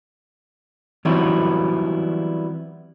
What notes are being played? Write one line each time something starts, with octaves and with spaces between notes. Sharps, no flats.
E3 F#3 G3 B3 C4 E4